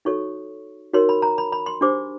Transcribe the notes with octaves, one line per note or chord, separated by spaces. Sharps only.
D#4 F#4 A4 C#5 C#6
D#4 F#4 A#4 C#5 C6
B5
A#5
B5
B5
C6
D4 G4 C5 D6